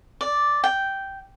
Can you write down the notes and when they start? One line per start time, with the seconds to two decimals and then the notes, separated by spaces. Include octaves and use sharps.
0.21 D5
0.64 G5